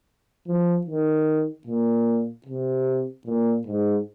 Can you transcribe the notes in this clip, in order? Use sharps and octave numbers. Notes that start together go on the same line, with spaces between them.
F3
D#3
A#2
C3
A#2
G#2